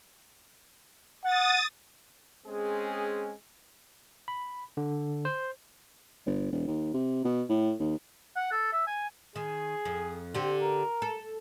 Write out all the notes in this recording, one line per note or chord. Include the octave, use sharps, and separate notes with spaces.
F#5 D#6 A6
G#3 C4 C#4 G#4
B5
D3
C5
G1
E1
D#2
C3
B2
A2
D#2
F#5
A4
E5
G#5
D#3 G#4
F2
D3 C4 G4
A#4
A4